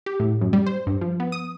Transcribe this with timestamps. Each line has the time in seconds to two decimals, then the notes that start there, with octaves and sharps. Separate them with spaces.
0.06 G4
0.20 A2
0.41 F#2
0.53 G3
0.66 C5
0.87 G2
1.01 F3
1.20 B3
1.32 D#6